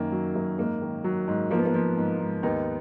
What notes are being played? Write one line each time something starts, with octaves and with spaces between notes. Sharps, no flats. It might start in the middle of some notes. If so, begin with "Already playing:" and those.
Already playing: F#2 D#3 A#3
F#3
F#2
G#2 A#3
D#3
F#3
G#2
F3 A#3
B3
A#3
F3
G#2
G#2
D#2 B3 D#4